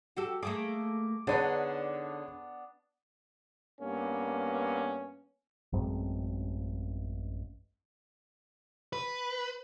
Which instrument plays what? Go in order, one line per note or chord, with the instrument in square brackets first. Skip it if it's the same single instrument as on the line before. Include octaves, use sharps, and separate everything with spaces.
[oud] F#4 G4 A4
[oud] A3 A#3 G#4 [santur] D6
[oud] D3 D#4 B4 [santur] B3 D4 [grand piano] G#4 C#5
[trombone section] G2 A#3 B3 C#4
[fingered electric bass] A1 F#2 G#3 C4
[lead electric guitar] B4